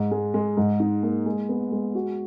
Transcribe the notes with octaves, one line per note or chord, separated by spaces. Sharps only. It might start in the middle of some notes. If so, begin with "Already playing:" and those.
Already playing: G#2
G#3
G#3
G#2
D#4
A#3
G#3
B3
G#3
F#4